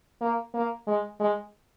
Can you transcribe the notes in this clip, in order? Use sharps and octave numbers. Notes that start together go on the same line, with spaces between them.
A#3
A#3
G#3
G#3